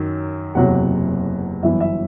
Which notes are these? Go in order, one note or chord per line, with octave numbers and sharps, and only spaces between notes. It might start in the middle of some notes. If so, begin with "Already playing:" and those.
Already playing: F#2 D#3 F#3
F#1 E2 C3 F#3 F#5
G1 F#2 E3 B3 E5
E5